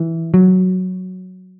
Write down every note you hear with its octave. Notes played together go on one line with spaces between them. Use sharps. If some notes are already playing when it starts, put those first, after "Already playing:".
Already playing: E3
F#3